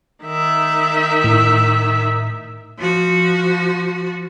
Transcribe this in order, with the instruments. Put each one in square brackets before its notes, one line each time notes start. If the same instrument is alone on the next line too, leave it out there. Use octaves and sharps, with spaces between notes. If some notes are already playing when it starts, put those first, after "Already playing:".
[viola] D#3 E5
[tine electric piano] A2
[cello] F3 F#4